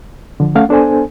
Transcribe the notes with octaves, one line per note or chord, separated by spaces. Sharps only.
D3 F3
A3 C#4 F5 F#5
B3 D4 A4 C5 G#5